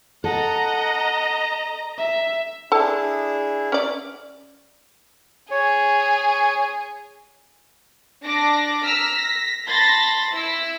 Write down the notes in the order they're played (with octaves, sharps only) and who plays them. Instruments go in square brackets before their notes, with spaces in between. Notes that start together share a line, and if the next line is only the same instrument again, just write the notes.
[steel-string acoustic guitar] A4 [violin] D#5 A#5 [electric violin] F#5
[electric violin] E5
[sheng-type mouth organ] D4 E4 G#4 [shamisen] A4 A5
[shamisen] C#4 D5
[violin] G#4 [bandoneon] C#5
[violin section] D4 D6 A#6
A#5 E6 F6 A#6 B6
A#6 B6
A5 B5 C6 A6 A#6
E4 E6